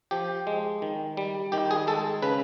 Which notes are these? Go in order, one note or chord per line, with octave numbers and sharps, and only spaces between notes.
F3 G4
G#3
D#3
G3
D#3 G4
G#4
G#3 A4
C#3 B4